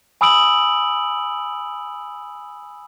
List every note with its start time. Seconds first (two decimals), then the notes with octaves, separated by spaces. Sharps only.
0.21 G#5 B5 D#6 E6 D7 F#7